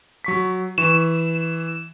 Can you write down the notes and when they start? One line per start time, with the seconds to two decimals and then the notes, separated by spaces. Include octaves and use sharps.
0.24 F#3 C#6 B6
0.78 E3 C#6 E7